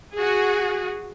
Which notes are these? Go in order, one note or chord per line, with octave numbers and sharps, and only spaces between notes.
F#4 G#4